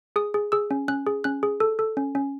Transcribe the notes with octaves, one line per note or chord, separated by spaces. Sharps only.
G#4 D#6
G#4
G#4 E6
C#4
C#4 F#6
G#4
C#4 F#6
G#4
A4
A4
C#4
C#4